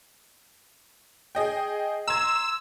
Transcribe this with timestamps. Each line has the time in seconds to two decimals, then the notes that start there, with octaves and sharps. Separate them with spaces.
1.35 G#4 D#5 G5
2.07 A#5 C6 E6 G#6